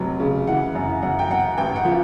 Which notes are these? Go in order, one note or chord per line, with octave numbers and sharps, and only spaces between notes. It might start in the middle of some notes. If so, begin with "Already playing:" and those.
Already playing: F1 F#3
C#3
E3 F#5
F#2
F#2 F#5
G5
F#2 F#5
A1 G5
F#5
F3